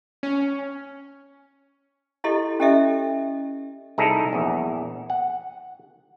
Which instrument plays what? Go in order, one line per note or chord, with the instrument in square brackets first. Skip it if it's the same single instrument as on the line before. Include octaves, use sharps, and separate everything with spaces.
[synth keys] C#4
[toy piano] E4 F4 G4 A4 D#5 C6
C#4 G4 A4 D#5 E5
[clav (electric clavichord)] C2 D#4 E4 G#4 A4 A#5
A#1 E2
F#5